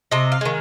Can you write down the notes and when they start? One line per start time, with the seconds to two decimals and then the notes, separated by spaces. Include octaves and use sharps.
0.11 C3 D#5
0.32 F5
0.41 D#3 G#3